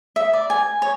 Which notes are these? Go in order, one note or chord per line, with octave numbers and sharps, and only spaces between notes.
E5
D5
G#5
C#5